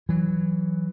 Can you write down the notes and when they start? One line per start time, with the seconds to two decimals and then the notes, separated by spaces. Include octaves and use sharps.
0.09 E3 F#3